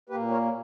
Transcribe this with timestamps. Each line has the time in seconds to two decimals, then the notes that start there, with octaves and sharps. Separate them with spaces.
0.09 A#3 G4 B4
0.14 A#2
0.30 A#4 C#5